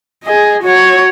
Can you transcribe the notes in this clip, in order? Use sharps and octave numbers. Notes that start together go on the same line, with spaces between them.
G#4 D#5
F#4 C#5